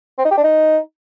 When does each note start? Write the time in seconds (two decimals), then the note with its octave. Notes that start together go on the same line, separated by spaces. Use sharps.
0.19 C4
0.25 D#4
0.31 G4
0.37 D4
0.44 D#4